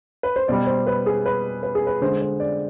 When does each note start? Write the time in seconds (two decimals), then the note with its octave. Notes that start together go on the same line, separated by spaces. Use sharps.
0.23 B4
0.36 C5
0.48 B2 G3 D5
0.67 C5
0.87 B4
1.06 G#4
1.26 B4
1.63 B4
1.75 G#4
1.87 B4
2.01 D3 G#3 C5
2.22 C5
2.40 D5